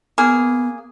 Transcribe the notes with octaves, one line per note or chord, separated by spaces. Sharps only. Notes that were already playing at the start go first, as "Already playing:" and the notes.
A#3 B3 G#4